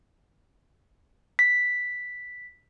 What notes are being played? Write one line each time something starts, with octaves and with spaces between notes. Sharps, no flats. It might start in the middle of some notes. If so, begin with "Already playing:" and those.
B6